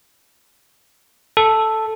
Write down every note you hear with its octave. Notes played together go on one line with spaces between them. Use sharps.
A4